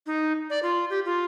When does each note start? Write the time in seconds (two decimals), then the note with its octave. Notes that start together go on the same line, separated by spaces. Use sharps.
0.06 D#4
0.50 D5
0.63 F4
0.90 G4
1.05 F4